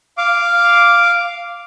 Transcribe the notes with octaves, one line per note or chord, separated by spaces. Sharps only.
F5 D6